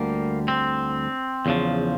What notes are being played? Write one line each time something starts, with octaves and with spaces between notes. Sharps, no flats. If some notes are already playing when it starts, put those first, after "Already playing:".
Already playing: D2 D3 G3 A#3
C4
E2 C#3 F3